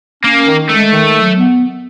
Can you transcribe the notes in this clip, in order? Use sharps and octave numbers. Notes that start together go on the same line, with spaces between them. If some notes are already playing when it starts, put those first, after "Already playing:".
A#3 C#4
D#3
G#3 A3
D#3
F#3
B3